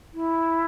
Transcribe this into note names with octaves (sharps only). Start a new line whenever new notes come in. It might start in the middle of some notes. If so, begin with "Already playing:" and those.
E4